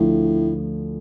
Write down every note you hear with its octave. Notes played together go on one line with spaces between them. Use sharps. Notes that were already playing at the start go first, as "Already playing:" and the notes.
Already playing: D2 A2 D3 F3